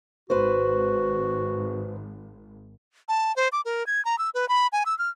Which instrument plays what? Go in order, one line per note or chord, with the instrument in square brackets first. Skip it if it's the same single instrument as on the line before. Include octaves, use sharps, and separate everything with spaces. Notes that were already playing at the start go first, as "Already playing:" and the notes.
[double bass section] G#1 [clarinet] F#4 [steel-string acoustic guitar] B4 C5
[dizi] A5
C5
D6
A#4
G#6
A#5
E6
B4
B5
G#5
E6
F6